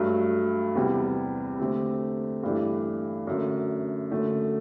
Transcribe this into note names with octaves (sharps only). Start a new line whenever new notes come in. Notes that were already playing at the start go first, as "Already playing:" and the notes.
Already playing: G2 F#3 A3
E2 C3 G3
D3 A3 C4 G4 C5
G2 E3 A3 D4 G4
F#2 D3 A3
F#2 D3 A3